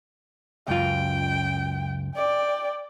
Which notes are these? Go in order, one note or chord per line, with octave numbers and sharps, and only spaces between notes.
C#2 F#2 F4 G5
D5 G5